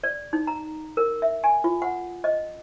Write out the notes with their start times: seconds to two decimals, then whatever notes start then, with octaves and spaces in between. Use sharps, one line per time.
0.04 D5
0.33 D#4
0.47 A#5
0.97 A#4
1.22 E5
1.44 G#5
1.64 F4
1.82 F#5
2.24 D#5